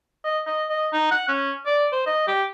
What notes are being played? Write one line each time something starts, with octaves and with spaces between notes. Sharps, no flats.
D#5
D#5
D#5
D#4
F#5
C#4
D5
C5
D#5
G4